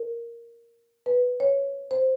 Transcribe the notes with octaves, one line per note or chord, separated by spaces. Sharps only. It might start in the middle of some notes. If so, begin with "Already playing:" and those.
Already playing: A#4
B4
C#5
C5